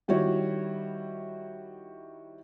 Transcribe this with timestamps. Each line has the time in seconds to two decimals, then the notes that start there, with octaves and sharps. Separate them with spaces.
0.08 D#3 G3 E4 F#4 C#5